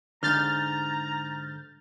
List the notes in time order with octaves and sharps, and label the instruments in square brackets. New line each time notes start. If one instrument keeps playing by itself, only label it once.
[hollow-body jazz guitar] G#2 D3 [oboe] A#5 [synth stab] F6 G6 A6